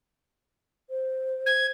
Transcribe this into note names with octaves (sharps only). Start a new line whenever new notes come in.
C5
G#6